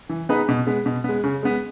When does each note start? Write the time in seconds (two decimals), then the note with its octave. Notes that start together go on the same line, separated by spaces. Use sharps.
0.09 E3
0.29 B3 D#4 G#4 B4
0.48 B2
0.67 G#3 B3
0.86 B2
1.04 G#3 B3
1.24 C#3
1.43 G#3 B3